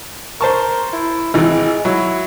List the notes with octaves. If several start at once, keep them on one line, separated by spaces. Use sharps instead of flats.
A#4 C5 A5 C#6
E4
G#1 E3 G#3
F#3 E4